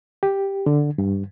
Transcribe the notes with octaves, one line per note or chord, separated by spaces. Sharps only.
G4
D3
G2